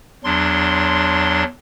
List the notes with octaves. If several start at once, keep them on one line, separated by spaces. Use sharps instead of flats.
E2 F#3 D4 C6